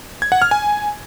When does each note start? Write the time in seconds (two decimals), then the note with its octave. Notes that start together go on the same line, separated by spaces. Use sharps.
0.22 G#6
0.32 F#5
0.42 F6
0.51 G#5